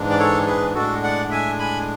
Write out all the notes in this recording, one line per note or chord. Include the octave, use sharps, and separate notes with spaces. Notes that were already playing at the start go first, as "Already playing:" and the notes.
Already playing: G#2 E3 G#3 D4
D5
A4 C#5
G#4 B4
A2 G#3 D4 F#4 A4
D5 F#5
E5 G#5
G#5 B5